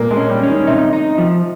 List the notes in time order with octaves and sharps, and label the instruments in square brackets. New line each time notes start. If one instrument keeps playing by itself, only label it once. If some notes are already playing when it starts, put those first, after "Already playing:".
Already playing: [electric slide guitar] A#2 [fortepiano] G#3 A#3
[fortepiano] G#3
[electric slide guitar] C#4
[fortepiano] G3
[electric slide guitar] C#4
[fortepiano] D#3
[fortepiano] C3 [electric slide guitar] D#4
[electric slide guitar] D#4
F3